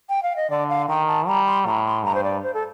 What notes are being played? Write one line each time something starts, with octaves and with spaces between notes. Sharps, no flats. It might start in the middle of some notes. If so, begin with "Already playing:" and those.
G5
F5
D#5
D3 D5
F5
D#3 G5
A5
G3 A#5
C6
A2 A#5
C6
G2 A#5
C5
D5
C5
A4